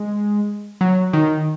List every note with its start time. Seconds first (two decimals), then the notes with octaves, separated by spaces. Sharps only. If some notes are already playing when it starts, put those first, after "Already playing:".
Already playing: G#3
0.81 F#3
1.13 D#3